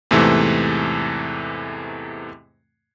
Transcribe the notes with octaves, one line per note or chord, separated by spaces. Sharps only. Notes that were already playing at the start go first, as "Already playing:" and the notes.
E2 G#2 C3 E3 A3